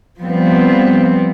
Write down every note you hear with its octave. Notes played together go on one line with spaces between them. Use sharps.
F3 G3 B3 C4